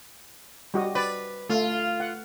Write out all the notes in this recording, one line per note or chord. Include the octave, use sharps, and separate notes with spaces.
G3 F#4 D#5
B4 D5
A3 F4
F#5